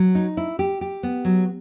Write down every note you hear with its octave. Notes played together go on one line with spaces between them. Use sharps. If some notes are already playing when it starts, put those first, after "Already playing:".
Already playing: F#3
D#4
E4
G4
G4
B3
F#3